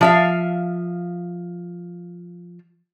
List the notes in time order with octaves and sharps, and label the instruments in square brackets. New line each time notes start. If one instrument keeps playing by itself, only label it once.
[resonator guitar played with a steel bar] F3 E5 F5